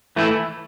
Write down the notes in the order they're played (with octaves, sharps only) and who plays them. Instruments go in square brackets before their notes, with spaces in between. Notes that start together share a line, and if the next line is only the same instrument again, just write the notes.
[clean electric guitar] E3 A3 E4